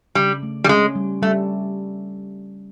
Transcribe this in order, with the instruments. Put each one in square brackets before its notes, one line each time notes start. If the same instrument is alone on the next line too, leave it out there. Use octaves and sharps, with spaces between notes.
[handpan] C#3 [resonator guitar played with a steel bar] G3
[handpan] A3
[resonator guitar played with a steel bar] G3
[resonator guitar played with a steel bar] G#3 [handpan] C#4
[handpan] G3
[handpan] G3 [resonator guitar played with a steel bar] A3